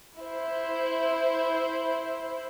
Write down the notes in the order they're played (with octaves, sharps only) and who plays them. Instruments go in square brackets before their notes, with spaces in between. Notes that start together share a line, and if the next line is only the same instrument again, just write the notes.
[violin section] E4 C5